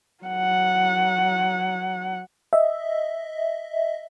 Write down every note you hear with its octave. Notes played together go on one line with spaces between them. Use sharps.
F#3 F#5
D#5 E5